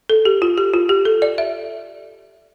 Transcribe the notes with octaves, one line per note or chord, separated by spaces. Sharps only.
A4
G4
F4
G4
F4
G4
A4
D5
E5